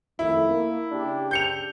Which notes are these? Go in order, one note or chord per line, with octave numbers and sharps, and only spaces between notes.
F2 D#3 A3 E4
A#3
C#3 D4 G4
G6 C#7 F7